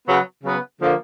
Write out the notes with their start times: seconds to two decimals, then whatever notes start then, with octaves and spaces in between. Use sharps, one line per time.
0.06 C#3 F#3 B3
0.44 C#3 F#3 B3
0.81 D3 F3 A#3